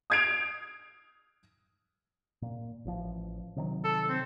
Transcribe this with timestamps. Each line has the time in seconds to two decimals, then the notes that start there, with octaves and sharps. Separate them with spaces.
0.10 D#6 G6 G#6 C7 D7 F7
2.42 A#2
2.85 A1 F3
3.56 C3 D#3 F#3
3.84 A4
4.09 C4